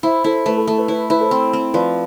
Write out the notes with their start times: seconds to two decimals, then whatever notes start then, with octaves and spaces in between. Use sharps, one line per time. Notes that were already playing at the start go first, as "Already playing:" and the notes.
0.03 E4 C5 E5
0.24 E4 A4 C5
0.46 A3 B4
0.57 A4
0.68 A3 A4
0.78 B4
0.88 E4 B4
1.10 E4 B4
1.20 A4 C5
1.31 C4
1.53 C4
1.74 F3 B4 D5